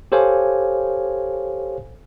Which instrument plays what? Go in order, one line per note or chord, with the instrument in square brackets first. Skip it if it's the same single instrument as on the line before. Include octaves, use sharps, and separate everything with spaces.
[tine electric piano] G4 A4 C5 C#5 F5 G#5